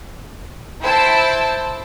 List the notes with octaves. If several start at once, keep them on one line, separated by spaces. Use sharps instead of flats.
E4 C5 A5 E6 D7